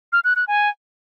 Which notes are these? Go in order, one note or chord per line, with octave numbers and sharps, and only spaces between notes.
F6
F#6
F#6
G#5